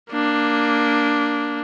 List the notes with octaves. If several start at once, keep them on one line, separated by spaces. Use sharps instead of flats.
A#3 D4